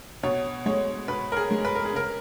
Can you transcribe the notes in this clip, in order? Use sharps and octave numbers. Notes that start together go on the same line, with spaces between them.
B2 C#5
G#3 C#5
B2 B4
A#4
G#4
G#3
B4
A#4
G#4
C#3 A#4